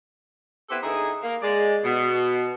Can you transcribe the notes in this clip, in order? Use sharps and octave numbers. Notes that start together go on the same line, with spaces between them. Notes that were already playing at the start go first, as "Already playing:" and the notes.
B3 C4 E4 G4 A4 B4
D3 D#4 E4 G#4
A#3
G#3 D5
B2